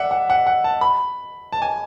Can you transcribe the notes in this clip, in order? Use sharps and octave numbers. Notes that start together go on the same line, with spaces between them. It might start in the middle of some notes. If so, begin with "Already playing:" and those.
Already playing: D5 E5 F#5
F#5
F#5
F#5
A5
B5
A5
G#5